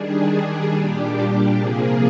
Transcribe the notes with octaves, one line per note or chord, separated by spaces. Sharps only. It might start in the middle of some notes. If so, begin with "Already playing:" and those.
Already playing: D#3 G3 D4 G#4
G#4
A#2 G3 D4 G4
G4
C3 F3 A#3 G#4